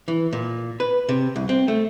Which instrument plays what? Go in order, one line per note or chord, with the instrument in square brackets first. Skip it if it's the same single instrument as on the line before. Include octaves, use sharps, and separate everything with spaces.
[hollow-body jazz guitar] E3
A#2
B4
C3
C2
C4
A3